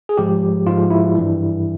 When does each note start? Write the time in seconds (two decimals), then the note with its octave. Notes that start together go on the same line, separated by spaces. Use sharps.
0.09 G#4
0.17 G#2 F3 G#3 G4
0.67 G#2 F3 G#3 F4
0.90 E4
1.15 G2 E3 G3